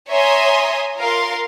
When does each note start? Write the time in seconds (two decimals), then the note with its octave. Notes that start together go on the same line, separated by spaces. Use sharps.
0.11 C#5 E5 G#5 A#5 C6 D#6
0.98 F4 A#4 F5 C6